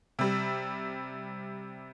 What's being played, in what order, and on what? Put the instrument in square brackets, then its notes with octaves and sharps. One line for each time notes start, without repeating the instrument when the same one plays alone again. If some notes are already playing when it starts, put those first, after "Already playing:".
[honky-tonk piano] C3 G3